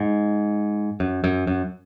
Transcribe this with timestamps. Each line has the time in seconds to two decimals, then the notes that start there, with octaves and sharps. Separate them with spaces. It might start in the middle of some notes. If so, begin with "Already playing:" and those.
Already playing: G#2
1.00 F#2
1.24 F#2
1.47 F#2